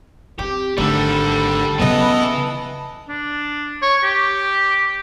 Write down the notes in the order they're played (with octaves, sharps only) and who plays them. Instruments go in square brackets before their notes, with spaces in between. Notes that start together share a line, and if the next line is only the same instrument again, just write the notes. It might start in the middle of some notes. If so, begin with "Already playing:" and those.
[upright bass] C4 [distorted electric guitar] G4
[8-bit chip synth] G#1 D3 [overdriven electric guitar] G3 [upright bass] A3 [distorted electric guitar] A4
[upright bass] C#3 F#3 [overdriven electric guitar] E3 B4 [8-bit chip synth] B3 D#5
[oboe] D4
C#5
G4